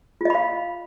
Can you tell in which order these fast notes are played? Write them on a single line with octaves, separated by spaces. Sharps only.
F4 D#5 B5 F5